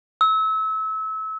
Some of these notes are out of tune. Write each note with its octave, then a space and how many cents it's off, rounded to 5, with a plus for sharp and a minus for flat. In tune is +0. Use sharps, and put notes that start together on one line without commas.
E6 -30